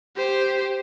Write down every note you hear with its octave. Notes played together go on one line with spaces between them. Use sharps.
G4 C5